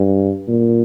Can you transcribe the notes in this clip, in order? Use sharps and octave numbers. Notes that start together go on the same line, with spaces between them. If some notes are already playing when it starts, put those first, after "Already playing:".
Already playing: G2
A#2